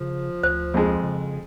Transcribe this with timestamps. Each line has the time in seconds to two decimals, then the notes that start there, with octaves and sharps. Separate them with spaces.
0.01 C#3 F3
0.43 D2 C5
0.74 F2 G#3
1.03 C#3